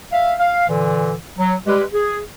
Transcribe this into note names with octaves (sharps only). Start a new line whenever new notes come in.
E5 F5
F5
A#2 D3 E3
F#3
G3 G#3 G4 B4
G#4